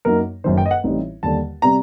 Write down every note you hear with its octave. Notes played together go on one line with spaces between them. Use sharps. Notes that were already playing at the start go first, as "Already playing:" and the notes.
F#2 F#3 A#3 D#4 A#4
F#1 F#2 D#3 C5
G5
D#5
F#5
A1 A2 G3 C4 D#4
D#2 D3 G3 A5
C3 G3 C4 A#5